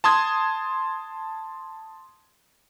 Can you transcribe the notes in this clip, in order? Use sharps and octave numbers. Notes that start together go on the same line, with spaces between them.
A5 C6 D#6 G#6